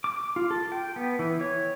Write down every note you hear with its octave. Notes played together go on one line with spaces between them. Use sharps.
D6
F4
A4
G5
B3
E3
C#5